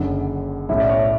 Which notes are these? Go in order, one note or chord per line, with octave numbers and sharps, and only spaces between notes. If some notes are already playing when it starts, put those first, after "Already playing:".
Already playing: F#1 F#2 D3
B1 A2 G3 C#4 E4 E5
D5
C#5